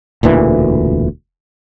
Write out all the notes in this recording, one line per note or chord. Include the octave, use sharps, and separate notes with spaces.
E1 D2 A#2 E3